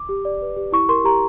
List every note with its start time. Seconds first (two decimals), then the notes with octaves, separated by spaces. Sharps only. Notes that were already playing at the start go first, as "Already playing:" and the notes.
Already playing: D6
0.09 G4
0.25 D5
0.42 B4
0.56 G4
0.72 E4 C#6
0.89 A#4 C6
1.04 G4 A#5